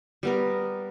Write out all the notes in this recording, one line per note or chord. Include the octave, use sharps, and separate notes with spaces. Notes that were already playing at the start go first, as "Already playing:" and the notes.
G3 B3 A#4